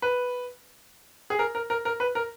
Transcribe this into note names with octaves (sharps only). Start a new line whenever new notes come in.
B4
G#4
A#4
A#4
A#4
A#4
B4
A#4